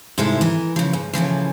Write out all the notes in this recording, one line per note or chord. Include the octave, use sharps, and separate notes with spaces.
G#2 C3 G3 G#3 E4 A4
E3 A#4
C#3 F3
G#2
A2 C#3 E3 F3